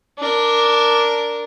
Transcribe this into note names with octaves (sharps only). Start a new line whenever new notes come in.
D4 A#4